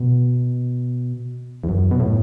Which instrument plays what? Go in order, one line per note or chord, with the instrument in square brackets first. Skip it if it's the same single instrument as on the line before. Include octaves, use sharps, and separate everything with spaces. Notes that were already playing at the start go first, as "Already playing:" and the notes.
Already playing: [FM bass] B2
E2
F#2
B2
A2